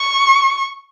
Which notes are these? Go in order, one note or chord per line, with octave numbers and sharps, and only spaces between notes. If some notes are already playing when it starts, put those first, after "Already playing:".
Already playing: C#6